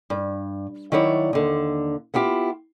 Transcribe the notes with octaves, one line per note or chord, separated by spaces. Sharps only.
G2
D#3 F#3 E4 C#5 D5
D#2 D3
B3 E4 F4 G4